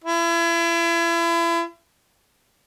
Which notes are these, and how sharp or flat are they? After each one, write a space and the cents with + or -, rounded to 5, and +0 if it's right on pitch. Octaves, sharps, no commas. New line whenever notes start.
E4 +35